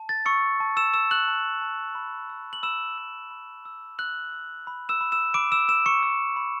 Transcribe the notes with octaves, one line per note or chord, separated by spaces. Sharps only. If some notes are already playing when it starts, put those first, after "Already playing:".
Already playing: A5
A6
C#6 E6 C#7
A5
E6 E7
E6 E7
F#6 F#7
A5
A5
B5
E6
F#7
B5 E6 E7
E6
B5
E6
E6 F#6 F#7
E6
B5
E6 E7
B5
E6 E7
B5 D6 D7
E6 E7
E6 E7
C#6 C#7
E6
B5